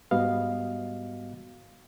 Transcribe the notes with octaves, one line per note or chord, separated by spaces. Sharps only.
G#2 G3 B3 F#4 D#5 F5